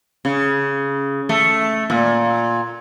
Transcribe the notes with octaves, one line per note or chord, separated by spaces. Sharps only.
C#3
A3
A#2